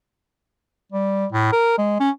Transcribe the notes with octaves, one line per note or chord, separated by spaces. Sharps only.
G3
A2
A#4
G#3
C#4